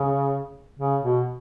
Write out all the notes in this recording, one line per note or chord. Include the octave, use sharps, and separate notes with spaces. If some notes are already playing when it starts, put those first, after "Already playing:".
Already playing: C#3
C#3
B2